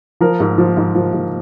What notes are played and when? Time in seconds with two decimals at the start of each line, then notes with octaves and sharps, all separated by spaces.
0.21 F3 A#4
0.40 G#2
0.58 F3
0.77 G#2
0.95 F3
1.13 G#2